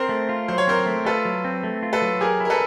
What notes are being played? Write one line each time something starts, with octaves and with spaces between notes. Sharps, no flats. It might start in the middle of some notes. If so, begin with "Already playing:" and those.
Already playing: C4 A#4 C5
A3
F4
F#3 C5
C#5
C4 A#4 C5
A3
F4 A4 B4
F#3
C4
A3
F4
A4 B4
F#3
G4 G#4 A#4
E4
A#4
A4 B4